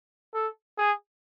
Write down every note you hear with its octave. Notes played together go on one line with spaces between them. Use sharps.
A4
G#4